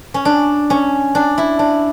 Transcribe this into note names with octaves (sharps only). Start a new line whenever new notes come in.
C#4
D4
C#4
D4
E4
D4